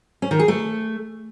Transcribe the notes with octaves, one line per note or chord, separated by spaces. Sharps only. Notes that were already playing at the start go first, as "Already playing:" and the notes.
C#4
D#3
G#4
A3